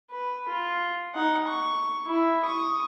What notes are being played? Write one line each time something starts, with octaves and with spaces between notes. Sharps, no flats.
B4
F4
D#4 F#5
C#6
E4
C#6 D#6